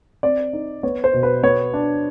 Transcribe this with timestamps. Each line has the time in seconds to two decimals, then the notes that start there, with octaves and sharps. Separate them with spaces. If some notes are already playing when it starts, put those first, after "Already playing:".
0.23 C4 D5
0.53 D#4
0.83 B3 C#5
1.04 C5
1.13 B2
1.23 B4
1.43 B3 C#5
1.73 D4